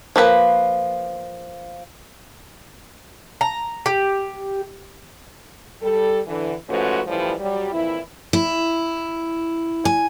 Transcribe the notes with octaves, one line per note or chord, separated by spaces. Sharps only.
F3 A#3 B4 B5
A#5
G4
G3 A4
D3 E3
G#2 F3 A3 C#4 F#4 B4
F#2 A2 E3 F3 G3
F#3 G3
F2 A#2 E3 E4
E4
G#5